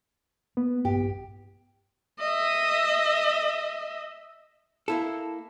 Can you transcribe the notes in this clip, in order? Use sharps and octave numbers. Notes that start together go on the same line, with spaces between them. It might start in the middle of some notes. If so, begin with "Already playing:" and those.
A#3 B3
A#1 G2 G4
D#5 E5
A#3 E4 A4